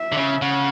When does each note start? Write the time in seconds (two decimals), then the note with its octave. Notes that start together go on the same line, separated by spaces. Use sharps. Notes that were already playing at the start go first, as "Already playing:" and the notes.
Already playing: E5
0.12 D3
0.17 C#3
0.41 C#3 F#5